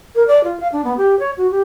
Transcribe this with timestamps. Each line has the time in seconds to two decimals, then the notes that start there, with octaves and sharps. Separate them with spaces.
0.15 A#4
0.27 D5
0.44 F4
0.60 F5
0.72 D4
0.84 B3
0.97 G4
1.19 C#5
1.37 F#4
1.51 G4